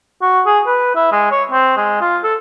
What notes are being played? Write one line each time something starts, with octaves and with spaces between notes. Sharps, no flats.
F#4
G#4
B4
E4
G#3
C#5
C4
G#3
F4
A4